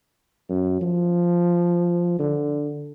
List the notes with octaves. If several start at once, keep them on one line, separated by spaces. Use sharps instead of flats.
F#2
F3
D3